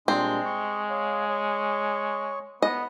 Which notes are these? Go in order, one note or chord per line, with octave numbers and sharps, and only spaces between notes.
A#2 G3 G#3 C4 D4
C#6
C#5 F5
C#5 C#6
B3 D#5